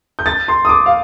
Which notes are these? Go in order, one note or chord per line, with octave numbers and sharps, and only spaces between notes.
G6
A6
C6
D#6
D6
F5